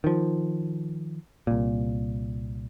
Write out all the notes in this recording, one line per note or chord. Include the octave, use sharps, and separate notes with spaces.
D#3 F3
C2 A#2